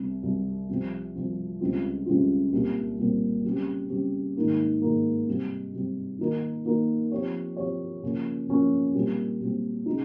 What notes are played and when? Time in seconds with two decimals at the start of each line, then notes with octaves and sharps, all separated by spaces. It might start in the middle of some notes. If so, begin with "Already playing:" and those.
Already playing: C2 C3 G3
0.23 C2 C3 G3
0.69 C2 C3 F3 C4
1.15 C2 C3 F3 C4
1.60 C#2 C#3 G3 C4 F4
2.06 C#2 C#3 G3 C4 F4
2.52 C2 A#2 G3 C4
2.98 C2 A#2 G3 C4
3.45 C#3 G3 C4 G4
3.89 C#3 G3 C4 G4
4.36 G#2 D#3 A#3
4.82 G#2 D#3 A#3
5.27 C3 G3 C4
5.73 C3 G3 C4
6.19 D#3 A#3 D#4 A#4
6.65 D#3 A#3 D#4 A#4
7.12 F3 C4 G4 C#5
7.57 F3 C4 G4 C#5
8.03 C#3 F3 A#3 C#4
8.49 C#3 F3 A#3 C#4
8.94 A#2 G3 C4
9.40 A#2 G3 C4
9.86 C#3 G#3 D#4